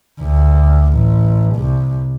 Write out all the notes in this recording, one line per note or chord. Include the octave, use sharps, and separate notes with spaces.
D2
A1
C2